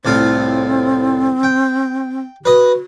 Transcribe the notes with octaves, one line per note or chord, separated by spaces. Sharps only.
C2 A2 C4 F4
G5
F#4 B4 D#5